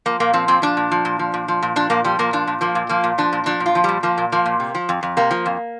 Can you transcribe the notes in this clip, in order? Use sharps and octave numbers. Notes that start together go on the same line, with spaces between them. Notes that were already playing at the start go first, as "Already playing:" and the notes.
F3 A#3
A#2 A#3
F3 C4
A#2 C4
F3 D4
A#2
F3
A#2
F3
A#2
F3
A#2
F3 D4
A#2 A#3
F3 G3
A#2 A#3
F3 D4
A#2
F3 A#3
A#2
F3 A#3
A#2
F3 D4
A#2
F3 D4
A#2
F4
F3
A#2 G3
F3 A#3
A#2
F3 A#3
A#2
C3
F3
F2
F2
C3 A#3
F3
F2